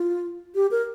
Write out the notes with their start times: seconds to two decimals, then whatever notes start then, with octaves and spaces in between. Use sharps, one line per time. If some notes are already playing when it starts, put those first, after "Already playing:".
Already playing: F4
0.55 G4
0.71 A#4